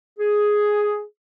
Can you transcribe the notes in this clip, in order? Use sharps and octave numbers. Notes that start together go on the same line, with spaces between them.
G#4